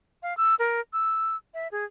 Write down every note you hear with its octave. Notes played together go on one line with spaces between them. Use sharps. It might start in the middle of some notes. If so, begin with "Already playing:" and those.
F5
E6
A#4
E6
E5
G#4